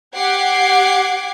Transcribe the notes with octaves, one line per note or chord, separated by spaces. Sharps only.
G4 F#5 G5 D6 G#6 C7